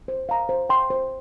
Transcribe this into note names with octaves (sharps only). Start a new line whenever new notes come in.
C5
F5 A#5
C5
G5 C6
C5